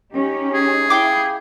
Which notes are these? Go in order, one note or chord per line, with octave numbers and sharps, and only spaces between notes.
C#4 D#4 G4
G#4
E4 F5 G5 D6